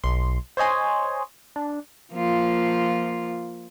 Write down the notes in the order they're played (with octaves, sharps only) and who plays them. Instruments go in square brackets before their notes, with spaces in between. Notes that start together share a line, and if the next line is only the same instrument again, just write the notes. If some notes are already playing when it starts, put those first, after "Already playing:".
[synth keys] B1 C6
C5 C#5 D#5 G#5 C6
D4
[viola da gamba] F3 A#3 F4